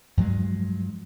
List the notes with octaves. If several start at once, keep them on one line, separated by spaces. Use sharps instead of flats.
G2 F3 F#3 G#3